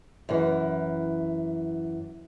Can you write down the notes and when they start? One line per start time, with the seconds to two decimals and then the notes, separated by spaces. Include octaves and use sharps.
0.29 F#2 E3